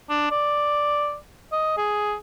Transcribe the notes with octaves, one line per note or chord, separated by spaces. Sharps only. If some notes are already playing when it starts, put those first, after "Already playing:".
D4
D5
D#5
G#4